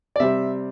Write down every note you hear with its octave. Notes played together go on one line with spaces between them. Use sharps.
D5
C3 G3 C4 E5